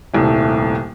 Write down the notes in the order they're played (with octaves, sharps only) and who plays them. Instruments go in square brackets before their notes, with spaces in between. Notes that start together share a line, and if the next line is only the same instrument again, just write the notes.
[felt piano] D#1 C2 A3